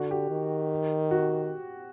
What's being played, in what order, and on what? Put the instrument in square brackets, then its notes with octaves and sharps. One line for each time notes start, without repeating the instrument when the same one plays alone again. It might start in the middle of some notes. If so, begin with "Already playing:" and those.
Already playing: [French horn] D3 [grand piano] F#4
[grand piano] G4
[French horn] D#3
[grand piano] F#4